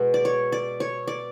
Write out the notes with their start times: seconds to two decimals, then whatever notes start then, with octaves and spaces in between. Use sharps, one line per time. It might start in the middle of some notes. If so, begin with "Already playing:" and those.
Already playing: B2 G#3 B3
0.14 D5
0.25 C#5
0.52 D5
0.80 C#5
1.08 D5